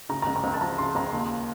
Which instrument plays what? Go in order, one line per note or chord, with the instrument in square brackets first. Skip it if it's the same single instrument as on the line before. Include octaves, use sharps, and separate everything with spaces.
[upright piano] C#3 A#5
A#5
C#2
A#5
C#2
A5
F3 A#5
C#3 C6
C#2 A#5
D#2